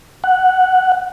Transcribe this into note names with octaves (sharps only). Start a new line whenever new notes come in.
F#5